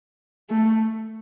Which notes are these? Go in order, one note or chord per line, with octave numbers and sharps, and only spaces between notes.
A3